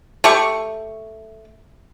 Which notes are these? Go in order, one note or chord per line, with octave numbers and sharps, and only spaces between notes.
A3 G4 C#6